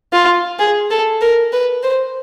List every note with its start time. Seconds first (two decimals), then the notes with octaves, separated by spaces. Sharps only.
0.13 F4
0.59 G#4
0.90 A4
1.21 A#4
1.53 B4
1.83 C5